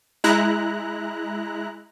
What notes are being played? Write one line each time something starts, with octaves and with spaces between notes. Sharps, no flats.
G#3 E4 A#5 F#6